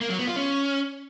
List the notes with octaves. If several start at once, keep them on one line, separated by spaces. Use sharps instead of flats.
A#3
F#3
B3
F4
C#4